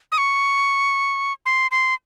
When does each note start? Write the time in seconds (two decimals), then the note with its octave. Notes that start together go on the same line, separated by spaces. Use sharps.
0.12 D#6
0.18 C#6
1.46 C6
1.71 C6